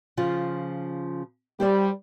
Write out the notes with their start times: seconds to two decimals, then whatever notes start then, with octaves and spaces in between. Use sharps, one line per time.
0.17 C#3 F3 F4
1.60 G3 G4 C5 D5